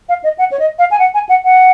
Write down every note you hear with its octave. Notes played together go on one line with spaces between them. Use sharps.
F5
D#5
F#5
C#5
D#5
F5
G#5
F#5
G#5
F#5
F#5